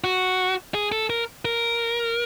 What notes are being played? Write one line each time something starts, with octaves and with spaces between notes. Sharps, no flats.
F#4
G#4
A4
A#4
A#4